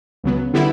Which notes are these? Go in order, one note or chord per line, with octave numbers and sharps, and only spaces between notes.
C#2 C#3 F#3 B3
D3 G3 B3 E4